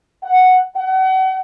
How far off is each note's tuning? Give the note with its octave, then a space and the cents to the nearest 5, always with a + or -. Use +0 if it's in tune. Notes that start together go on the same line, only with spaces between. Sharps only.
F#5 +0
F#5 +35